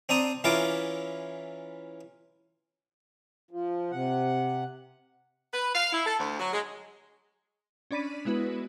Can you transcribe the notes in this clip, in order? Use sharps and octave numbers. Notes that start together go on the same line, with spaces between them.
C4 D4 A#5 D#6
E3 C#4 E4 F4 A#4 D6
F3
C3 F#5
B4
F5
E4
A4
D2
F#3
G#3
C#4 D4 D5 B5 B6 D#7
G#3 B3 E4 F#4 B4